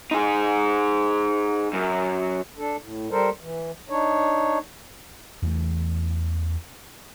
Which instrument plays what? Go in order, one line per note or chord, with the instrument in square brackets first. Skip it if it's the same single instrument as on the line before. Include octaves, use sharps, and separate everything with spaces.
[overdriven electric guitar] D#4 G#4
F#2
[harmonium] D4 A4
A2
G3 A4 A#4 C5
E3
D4 D#4 C#5
[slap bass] E2 E3 F#3 A3